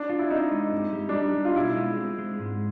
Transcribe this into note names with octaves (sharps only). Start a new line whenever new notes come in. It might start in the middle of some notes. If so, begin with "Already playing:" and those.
Already playing: D4
F4
E4
C4 D#4
G#3
G2
G3
D4
G3 D#4
G3
F4
B2 E4
G#3
C4
G#3
G#2